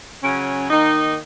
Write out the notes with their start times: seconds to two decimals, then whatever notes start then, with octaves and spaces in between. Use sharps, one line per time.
0.23 C#3 F#3 C#4
0.70 D#3 A#3 D#4